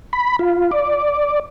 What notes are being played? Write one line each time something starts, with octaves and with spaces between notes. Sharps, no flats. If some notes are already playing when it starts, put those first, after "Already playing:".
B5
F4
D5